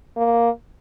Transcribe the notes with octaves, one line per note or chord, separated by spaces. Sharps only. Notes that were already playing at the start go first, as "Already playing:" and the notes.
A#3